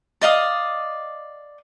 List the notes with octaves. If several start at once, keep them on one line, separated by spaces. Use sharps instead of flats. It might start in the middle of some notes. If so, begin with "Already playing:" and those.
D5 D#5 F5 D#6